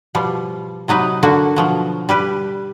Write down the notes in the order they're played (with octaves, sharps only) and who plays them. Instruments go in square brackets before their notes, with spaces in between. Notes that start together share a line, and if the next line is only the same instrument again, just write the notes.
[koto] B2 F3 G3
C3 F#3 D#4 B4
D3 A#3 F#4
B2 F3 F#3
G3 G4 B4